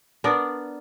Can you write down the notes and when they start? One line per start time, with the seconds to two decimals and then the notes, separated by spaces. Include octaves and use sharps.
0.24 B3 D4 A#4 D5